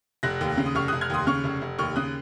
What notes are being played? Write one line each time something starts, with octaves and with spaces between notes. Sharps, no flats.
F1 F#6 A#6
D#2
C#3
D#6
F1 C#6 F6
F1 D#6 F#6
F6 G#6
D#2 C6 D#6
C#3 C#6 F6
F1
F1
D#2 C#6 F6
C#3 D#6 F#6